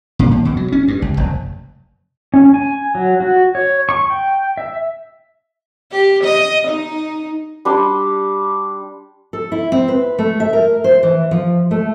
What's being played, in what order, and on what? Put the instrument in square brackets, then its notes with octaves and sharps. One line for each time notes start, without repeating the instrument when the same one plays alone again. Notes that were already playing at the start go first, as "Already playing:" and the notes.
[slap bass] A#2
D#2
B2
F#3
C#4
G2
C#2
F1
[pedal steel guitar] C#4
G#5
F#3
F#4
C#5
C#6
G5
E5
[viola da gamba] G4
D#5
D#4
[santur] G3 D4 C6
[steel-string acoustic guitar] A4
E4
C4
B4
A3
E5
A#4
C5
E3
F3
A3